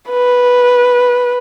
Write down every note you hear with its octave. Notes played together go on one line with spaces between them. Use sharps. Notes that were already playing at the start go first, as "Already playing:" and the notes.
B4